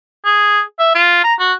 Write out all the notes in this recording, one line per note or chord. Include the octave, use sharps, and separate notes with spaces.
G#4
E5
F4
A#5
F#4